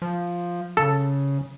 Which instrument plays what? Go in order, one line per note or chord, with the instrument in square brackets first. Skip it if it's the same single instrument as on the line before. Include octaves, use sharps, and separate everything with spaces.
[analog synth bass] F3
[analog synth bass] C#3 [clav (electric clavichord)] A4